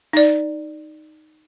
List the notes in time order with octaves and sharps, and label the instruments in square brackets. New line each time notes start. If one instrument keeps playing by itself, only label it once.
[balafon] D#4 D5